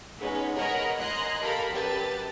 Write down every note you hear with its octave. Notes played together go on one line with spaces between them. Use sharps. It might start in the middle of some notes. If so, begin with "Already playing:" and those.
G#3 B3 C#4 D#4
A#4 C#5 D#5 F#5 A#5 B5
D#5 G#5 A#5 C6 F#6
G4 A4 A#4 F5 B5
F#2 G4 B4 A5 A6